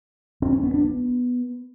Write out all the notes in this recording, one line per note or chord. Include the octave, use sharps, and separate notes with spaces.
C4
C#4
B3
D4
B3